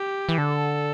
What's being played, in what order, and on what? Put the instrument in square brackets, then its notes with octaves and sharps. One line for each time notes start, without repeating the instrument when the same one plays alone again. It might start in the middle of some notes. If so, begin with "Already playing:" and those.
Already playing: [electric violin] G4
[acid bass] E3
[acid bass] D3 [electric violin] A4